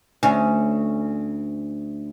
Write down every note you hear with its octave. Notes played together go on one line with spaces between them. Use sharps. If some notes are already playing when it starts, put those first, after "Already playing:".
D2 C#4